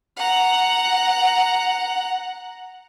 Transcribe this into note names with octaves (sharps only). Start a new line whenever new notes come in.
F#5 A#5